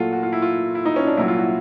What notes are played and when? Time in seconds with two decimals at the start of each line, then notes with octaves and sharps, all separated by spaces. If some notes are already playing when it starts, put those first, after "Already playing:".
Already playing: A#2 F#3 A3 F4 F#4 A4
0.13 F#4
0.23 F4
0.33 E4
0.42 F4
0.75 E4
0.85 D#4
0.96 C#4
1.07 D4
1.17 C2 A#2 F#3 E4
1.28 F4
1.38 F#4